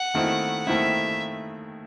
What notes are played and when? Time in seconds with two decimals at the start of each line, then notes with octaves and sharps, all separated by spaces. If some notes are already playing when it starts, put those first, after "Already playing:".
Already playing: F#5
0.14 D#2 D#3 A3 C4 E4
0.66 D#2 D#3 A3 C4 E4 E5